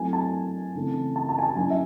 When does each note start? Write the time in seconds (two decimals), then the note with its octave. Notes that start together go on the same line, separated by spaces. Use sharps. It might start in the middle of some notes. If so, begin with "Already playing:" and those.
Already playing: F#3 A3 C4 E4 G#5
0.13 A5
0.75 C#3 E3 A3 C4
1.16 A5
1.29 A5
1.39 G#5
1.43 A5
1.56 F#3 C#4 E4 G#5
1.70 E5